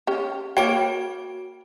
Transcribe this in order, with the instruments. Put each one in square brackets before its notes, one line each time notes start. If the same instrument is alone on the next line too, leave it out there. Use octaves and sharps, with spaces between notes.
[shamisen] C#4 G4
[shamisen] A#3 C#5 G5 [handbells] F#4 D7